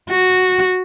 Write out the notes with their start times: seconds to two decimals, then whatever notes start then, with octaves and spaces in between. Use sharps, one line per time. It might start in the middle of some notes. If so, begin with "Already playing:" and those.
0.10 F#4